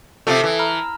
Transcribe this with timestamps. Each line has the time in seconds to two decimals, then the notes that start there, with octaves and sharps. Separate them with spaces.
0.27 C3 F3 A3 A4 E5
0.44 E3
0.59 A#5 B5 F6